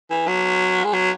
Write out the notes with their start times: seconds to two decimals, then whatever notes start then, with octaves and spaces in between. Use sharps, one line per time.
0.11 E3
0.27 F#3
0.84 G#3
0.93 F#3